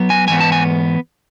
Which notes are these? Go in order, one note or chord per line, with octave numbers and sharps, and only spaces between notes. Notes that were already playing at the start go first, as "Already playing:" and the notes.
Already playing: F#3 B3
G#5
G#2 E3 B3 G#5
A5
G#5